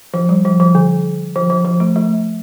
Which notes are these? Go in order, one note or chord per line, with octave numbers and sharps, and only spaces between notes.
F3
G3
F3
F3
D3
F3
F3
F3
A3
A3